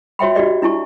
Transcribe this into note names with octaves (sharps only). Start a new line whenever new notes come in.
F#4 C#5 E5 G5 B5
D#4 F#4 G4 D5 D#5
D4 E4 A5 C#6